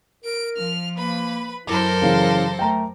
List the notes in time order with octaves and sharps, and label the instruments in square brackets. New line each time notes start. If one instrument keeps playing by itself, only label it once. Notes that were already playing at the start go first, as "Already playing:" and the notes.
[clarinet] A#4 [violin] D7
[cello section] F3 [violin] F6
[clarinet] A#3 [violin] B4 B5
[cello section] F#2 A#4 [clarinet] E4 [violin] A4 C5 [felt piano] D6
[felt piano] C#3 E3 [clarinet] F5
[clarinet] A3 [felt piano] G5 A#5